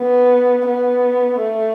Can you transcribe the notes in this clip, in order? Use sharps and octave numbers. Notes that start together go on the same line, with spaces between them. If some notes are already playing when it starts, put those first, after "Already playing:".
Already playing: B3
B3
A3